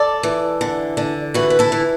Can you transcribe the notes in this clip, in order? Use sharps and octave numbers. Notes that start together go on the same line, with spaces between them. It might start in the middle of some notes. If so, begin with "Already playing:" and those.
Already playing: A4 D5
E3
D3
D3
E3 F#4 B4
B4
E4 A4
E3